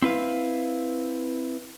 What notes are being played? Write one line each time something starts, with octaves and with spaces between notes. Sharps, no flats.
C4 E4 B4 F5